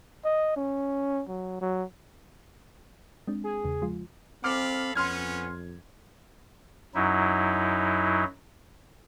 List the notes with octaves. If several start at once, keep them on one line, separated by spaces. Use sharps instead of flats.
D#5
C#4
F#3
F#3
G#3 C4 D4
G#4
E2 C#3
F3 G#3 F4
C4 A4 F5 B5 D6 F6
F2 B3 C#4 C6 F6 G#6
F#2 F#3 D#4 E4